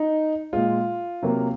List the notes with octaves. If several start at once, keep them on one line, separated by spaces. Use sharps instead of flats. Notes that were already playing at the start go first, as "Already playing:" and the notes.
Already playing: D#4
A#2 G#3 F4
C3 F#3 A#3